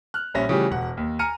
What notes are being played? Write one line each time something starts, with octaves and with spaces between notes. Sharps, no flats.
F6 F#6
A#1 G3 C#4 E5 A#6
C#3 E3 F3 G3 A3 G4
E1 F#5
D#2
G#5 A#5 F6 C#7 D#7